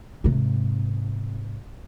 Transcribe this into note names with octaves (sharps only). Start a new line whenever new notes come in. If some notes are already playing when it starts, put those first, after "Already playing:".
G#2 C3